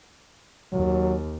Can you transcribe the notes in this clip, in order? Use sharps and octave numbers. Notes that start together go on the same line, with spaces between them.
D#2 F#3